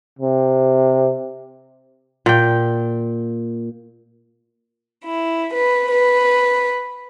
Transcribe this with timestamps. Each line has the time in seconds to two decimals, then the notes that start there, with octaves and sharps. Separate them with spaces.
0.19 C3
2.26 A#2 G5
5.05 E4
5.53 B4
5.91 B4